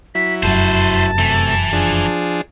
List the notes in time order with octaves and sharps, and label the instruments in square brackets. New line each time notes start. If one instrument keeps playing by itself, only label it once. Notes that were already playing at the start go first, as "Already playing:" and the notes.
[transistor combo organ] F#3 E4 [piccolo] B6
[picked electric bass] F1 F#2 [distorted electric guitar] B4 C5 [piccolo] A5
[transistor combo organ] C3 A3 [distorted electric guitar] E3
[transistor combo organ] F3 D4 G#4